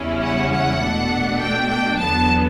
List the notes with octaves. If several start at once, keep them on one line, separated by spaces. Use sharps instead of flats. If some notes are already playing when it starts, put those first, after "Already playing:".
Already playing: E2 C#3 G3 C#4 E4
F#5
F#5
B2 A3 D4
G5
G5
E2 D3 F#3 B3 A5